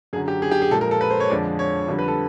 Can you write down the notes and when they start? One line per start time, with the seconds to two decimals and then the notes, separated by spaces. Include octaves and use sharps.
0.13 F#2 D3 F#3 G#4
0.28 G4
0.42 G#4
0.51 G4
0.62 G#4
0.71 A#2 F3 G#3 A4
0.81 A#4
0.91 A4
1.01 B4
1.11 C5
1.20 C#5
1.30 F2 D3 F3 G#3 D5
1.59 C#5
1.89 F2 D3 G3
1.99 B4
2.08 A4